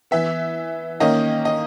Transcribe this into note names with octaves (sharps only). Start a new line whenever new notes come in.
E3 B3 E5
D#3 A#3 C#4 D#5
D#5